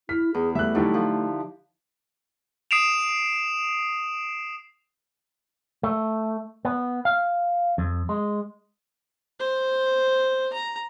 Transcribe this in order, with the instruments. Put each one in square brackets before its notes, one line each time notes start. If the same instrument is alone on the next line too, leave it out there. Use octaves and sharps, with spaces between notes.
[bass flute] E4 [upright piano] F6 B6
[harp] E2 [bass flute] G#4
[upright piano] G3 F#6 [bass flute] A3 [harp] E5
[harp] D3 F#3 G3 [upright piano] D#4 E4 G4
[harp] F3
[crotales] D#6 C7 D7 E7 F7
[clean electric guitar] A3
B3
F5
F2
G#3
[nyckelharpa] C5
A#5